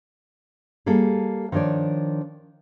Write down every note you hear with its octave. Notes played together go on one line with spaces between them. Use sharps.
G3 A#3 G#4 A4
D#3 F3 D4 C#5 D5